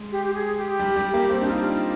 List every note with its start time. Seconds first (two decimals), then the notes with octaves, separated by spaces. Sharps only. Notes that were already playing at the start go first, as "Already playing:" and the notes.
Already playing: G#3
0.12 G4
0.26 G4
0.34 G#4
0.57 G4
0.79 G3
0.96 G3
1.14 A#3
1.30 C4
1.41 D4 G4
1.48 D#4 F4